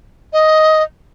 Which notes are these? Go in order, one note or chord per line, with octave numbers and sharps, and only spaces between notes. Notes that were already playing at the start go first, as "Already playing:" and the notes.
D#5